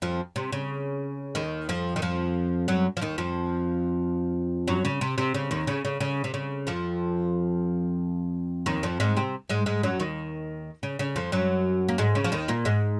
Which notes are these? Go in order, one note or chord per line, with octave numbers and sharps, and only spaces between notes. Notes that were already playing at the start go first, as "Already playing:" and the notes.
F2 F3
C3
C#3
D#2 D#3
F2 F3
D#3
F2 F3
F#2 F#3
F3
D#2 D#3
F2 F3
F#2 F#3
C#3
C3
C3
C#3
D#2 D#3
C#3
C#3
C#3
C3
C#3
F2 F3
D#2 D#3
F2 F3
G#2 G#3
C3 C4
G#2 G#3
G#2 G#3
F#2 F#3
D#2 D#3
C#3
C#3
F2 F3
F#2 F#3
A#3
G#2 G#3
C#3
F3
D#2 D#3
A#2 A#3
G#2 G#3